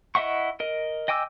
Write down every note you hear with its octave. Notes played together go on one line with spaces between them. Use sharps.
E4 D#5 E5 F#5 C#6
A#4 D#5
D#5 G5 G#5 D6 E6